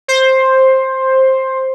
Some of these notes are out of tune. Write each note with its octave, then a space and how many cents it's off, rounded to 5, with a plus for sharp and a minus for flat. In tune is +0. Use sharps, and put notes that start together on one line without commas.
C5 +10